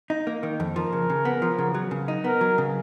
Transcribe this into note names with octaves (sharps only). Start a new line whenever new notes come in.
D#4
A#3
D#3
F2
F3 A#4
C#3
C#3
B3
F3
C#3
F#3
C#3
D#4
B3 A#4
F#3
C#3